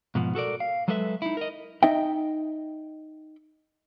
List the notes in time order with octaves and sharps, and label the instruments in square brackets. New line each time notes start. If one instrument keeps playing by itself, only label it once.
[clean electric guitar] G#2 B2 F3
F#4 A4 A#4 D5
F5
F#3 G#3 A4 B4 C#5 E5
D#4 E4
A#4 D#5
[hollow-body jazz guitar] D#4 D#5 E5 G5